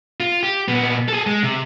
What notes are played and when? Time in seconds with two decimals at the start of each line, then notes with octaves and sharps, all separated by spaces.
0.20 F4
0.43 G4
0.68 A#2 B3
1.08 G#4 A4
1.27 G#3
1.43 C3